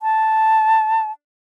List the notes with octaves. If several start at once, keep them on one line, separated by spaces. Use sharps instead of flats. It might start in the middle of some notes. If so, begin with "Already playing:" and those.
A5